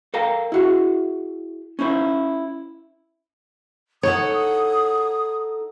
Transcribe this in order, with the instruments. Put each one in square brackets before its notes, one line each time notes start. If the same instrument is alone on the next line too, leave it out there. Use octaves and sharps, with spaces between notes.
[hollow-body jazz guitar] A4 A#4 F5 G5 A#5
E4 F#4 G#4
C#4 D#4 E4 C5
[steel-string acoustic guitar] D#4 A4 F#5 [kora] C#5 [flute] D#6